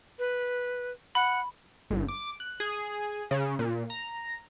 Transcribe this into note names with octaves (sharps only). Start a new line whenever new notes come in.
B4
F#5 B5
G1
D6
F#6
G#4
C#3
A#2
A#5